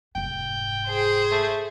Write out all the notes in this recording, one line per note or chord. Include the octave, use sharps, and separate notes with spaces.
F1 G#2 G5
G#4 C5
A3